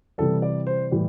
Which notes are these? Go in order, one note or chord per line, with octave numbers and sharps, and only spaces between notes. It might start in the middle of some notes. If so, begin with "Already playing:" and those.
C3 E3 G3 A4
D5
C5
A2 E3 G3